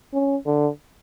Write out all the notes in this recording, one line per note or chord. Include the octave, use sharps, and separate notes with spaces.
C#4
D3